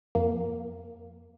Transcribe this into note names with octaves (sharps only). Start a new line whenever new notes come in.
F2 A#3